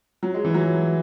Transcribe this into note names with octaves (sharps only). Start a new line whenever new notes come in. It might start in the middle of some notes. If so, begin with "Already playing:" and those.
F#3
G#3
E3
F#3